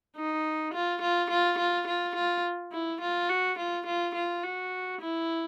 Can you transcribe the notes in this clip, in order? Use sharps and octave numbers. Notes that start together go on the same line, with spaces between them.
D#4
F4
F4
F4
F4
F4
F4
E4
F4
F#4
F4
F4
F4
F#4
E4